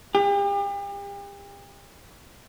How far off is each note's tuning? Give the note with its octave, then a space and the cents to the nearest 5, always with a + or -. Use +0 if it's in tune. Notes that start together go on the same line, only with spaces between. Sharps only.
G4 +40